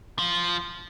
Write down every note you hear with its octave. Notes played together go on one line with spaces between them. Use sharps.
F3